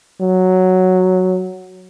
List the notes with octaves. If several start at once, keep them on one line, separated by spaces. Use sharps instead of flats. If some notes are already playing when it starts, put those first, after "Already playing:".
F#3